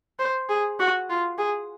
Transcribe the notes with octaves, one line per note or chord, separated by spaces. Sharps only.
C5
G#4
F#4
F4
G#4